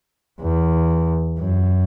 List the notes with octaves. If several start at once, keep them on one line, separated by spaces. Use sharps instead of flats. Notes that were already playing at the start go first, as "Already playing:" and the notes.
E2
F#2